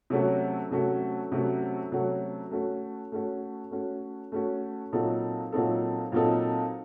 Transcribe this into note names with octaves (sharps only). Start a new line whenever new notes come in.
C3 F#3 A3 C#4 F#4
C3 F#3 A3 C#4 F#4
C3 F#3 A3 C#4 F#4
C3 F#3 A3 C#4 F#4
A3 C#4 F#4
A3 C#4 F#4
A3 C#4 F#4
A3 C#4 F#4
A#2 F#3 C4 D#4 A4
A#2 F#3 C4 D#4 A4
A#2 F#3 C4 D#4 A4